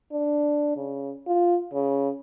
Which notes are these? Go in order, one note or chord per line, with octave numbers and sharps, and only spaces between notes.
D4
C#3
F4
C#3